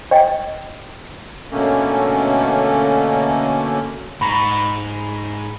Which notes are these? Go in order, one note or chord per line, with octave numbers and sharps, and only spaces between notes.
D5 D#5 G5
B2 D3 A3 A#3 C#4
G#2 A#5 B5 C#6